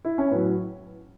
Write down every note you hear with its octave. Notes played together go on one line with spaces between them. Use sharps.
E4
C#4
A2 F#3 B3